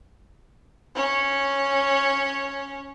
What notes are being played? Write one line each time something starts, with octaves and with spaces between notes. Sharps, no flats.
C#4 C#5